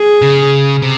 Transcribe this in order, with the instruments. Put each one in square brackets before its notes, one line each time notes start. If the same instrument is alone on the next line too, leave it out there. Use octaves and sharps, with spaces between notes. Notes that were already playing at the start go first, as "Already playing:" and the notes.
Already playing: [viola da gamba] G#4
[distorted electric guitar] C#3
C3